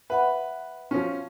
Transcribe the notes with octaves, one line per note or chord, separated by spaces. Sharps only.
B4 E5 F#5 B5
F3 C#4